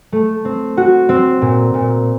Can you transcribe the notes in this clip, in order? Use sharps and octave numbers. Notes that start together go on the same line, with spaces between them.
A3
C4
F#4
C4
A#2
A#2